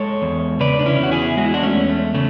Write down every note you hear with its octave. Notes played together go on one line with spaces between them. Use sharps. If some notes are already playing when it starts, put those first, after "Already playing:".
Already playing: G#3 A4 C#5
E2
C#3 B4 D5
D4
C#4 E4
E2 F#4
E4 G#4
G#3 F#4
E4
D4 F#4
A3 C#4
E2
A3
C#3 A3